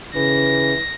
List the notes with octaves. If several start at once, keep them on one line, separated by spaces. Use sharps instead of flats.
C#3 E3 A#6